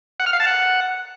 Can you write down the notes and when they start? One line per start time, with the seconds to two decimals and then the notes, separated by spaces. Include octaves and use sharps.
0.20 F#5
0.26 F6
0.33 F5
0.40 A5
0.47 F#5